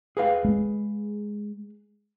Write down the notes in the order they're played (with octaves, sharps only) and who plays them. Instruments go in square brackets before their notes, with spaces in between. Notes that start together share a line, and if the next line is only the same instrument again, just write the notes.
[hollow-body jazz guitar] G#4 B4 F5
[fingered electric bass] G#3